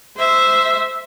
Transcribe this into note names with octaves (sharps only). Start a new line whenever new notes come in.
C5 E5